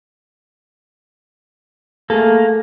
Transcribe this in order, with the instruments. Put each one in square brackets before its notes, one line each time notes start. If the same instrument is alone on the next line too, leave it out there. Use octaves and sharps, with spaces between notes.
[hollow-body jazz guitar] A3 G#4 A4 [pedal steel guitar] A#3